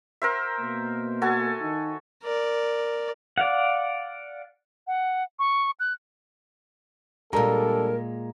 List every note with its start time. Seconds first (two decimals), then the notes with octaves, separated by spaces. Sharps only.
0.22 A#4 C5 E5
0.60 B2 A#3
1.22 F#4 A4 G#5
1.61 D#3 D#4
2.23 A#4 D5
3.38 D5 F5 F#5
4.87 F#5
5.39 C#6
5.80 F#6
7.33 A#2 G3 G#3 D4 A4 A#4 A#5